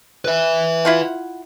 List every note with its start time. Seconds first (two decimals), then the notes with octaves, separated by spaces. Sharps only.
0.25 B4 E5
0.85 E4 F4 F#5